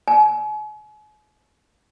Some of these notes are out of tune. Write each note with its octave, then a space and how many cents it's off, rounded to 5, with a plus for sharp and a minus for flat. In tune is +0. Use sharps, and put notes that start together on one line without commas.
G#5 +40